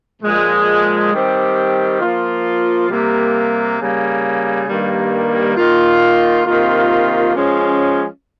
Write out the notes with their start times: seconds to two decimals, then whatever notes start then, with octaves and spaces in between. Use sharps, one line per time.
0.22 A#2 F3 G#3
1.10 D#3 G3 C4 G4
2.01 F3 A#3 F4
2.89 C3 G3 A#3
3.78 C#3 G3 A#3
4.67 G2 D#3 G3 A#3
5.56 D#3 A#3 F4
6.45 C3 D#3 A#3 F4
7.35 F3 G#3 C#4